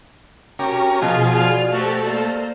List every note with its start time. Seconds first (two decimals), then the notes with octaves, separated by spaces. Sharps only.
0.59 C#4 F#4 G4 A#4
1.02 B2 F3 F4 G#4 D#5
1.33 F4 D5 F5
1.72 A3 F#4 G4 C5
2.05 A#3 C5 D5